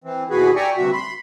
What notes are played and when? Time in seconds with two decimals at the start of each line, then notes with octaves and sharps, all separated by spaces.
0.04 E3 C4
0.30 D#2 B2 E3 F#4 G#4 B4
0.56 D5 E5 G5 G#5 A#5 C#6
0.77 D2 G2 C3 F#4 E5
0.93 B5 C6